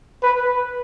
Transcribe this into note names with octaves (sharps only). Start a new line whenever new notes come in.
B4